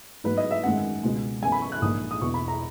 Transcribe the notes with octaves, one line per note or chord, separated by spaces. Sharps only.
G#2 F#3 B3 B4
D#5
E5
G#1 F#2 D#3 G#3 F#5
C#2 B2 G#3
F#2 E3 B3 G#5
B5
C#6
F#6
A#1 G#2 E3 D#6
D#6
E1 E2 B2 C#6
B5
A#5